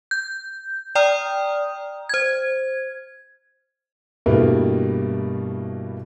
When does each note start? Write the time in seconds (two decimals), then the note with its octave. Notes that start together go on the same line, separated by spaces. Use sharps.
0.11 G6
0.95 D5 G5 A#5 D#6 F6
2.09 C5 G#6
4.26 G2 B2 G3 A3 A#3 E4